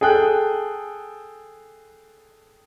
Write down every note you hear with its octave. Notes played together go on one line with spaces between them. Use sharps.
G#4 A4 G5 F#6